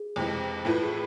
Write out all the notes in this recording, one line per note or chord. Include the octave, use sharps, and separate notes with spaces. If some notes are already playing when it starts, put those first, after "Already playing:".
Already playing: G#4
F2 C3 E3 G#3
A2 E3 A3 E4 F4 B4
G#4